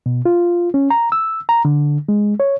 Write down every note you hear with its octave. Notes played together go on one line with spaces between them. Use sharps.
B2
F4
C#4
A#5
E6
A#5
D3
G#3
C#5